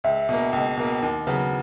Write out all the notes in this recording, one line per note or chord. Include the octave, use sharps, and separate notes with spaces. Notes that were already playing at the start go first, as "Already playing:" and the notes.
C#2 E5
B2 A#3
C#2
B2 A#3
D#2
C#3 F#3 B3